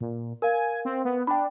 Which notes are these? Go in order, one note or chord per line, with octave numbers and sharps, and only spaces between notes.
A#2
A#4 F5 G#5
C4
B3
D4 G5 B5